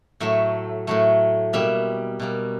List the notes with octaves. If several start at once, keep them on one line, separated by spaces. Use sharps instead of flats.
A2 F#3 A3 E5
A2 F#3 A3
B2 G3 A#3 E5
B2 G3 A#3